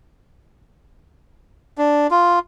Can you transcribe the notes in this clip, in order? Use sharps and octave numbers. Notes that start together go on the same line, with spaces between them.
D4
F4